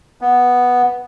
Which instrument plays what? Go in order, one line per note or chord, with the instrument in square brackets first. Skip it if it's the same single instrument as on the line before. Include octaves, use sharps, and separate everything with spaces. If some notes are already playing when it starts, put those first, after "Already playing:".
[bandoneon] B3